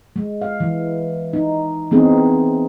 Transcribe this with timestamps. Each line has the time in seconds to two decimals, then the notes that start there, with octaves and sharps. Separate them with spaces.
0.16 G#3
0.42 F5
0.60 E3
1.33 D#4
1.91 E3 B3 C4 D#4 G#4